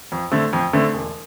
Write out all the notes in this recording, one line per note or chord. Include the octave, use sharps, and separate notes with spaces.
F2
D3 A3 C4
F2
D3 A3 C4
E1